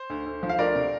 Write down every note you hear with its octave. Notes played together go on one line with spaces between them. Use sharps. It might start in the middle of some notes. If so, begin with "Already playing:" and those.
Already playing: C5
D2
D2
F3
F5
D2 A#4 D5
C3